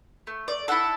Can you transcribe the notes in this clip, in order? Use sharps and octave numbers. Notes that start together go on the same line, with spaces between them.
A3
D5
E4 A4 F#5